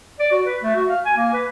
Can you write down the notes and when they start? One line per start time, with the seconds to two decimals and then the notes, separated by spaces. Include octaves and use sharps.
0.20 D5
0.32 F#4
0.46 B4
0.63 A3
0.76 F#4
0.90 F5
1.05 G#5
1.17 A#3
1.33 B4